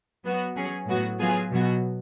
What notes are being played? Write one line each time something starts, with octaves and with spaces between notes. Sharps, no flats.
F#3 B3 F#4
F#3 C#4 G#4
A2 F#3 B3 F#4
F#3 B3 F4 G#4
B2 F#3 B3 F#4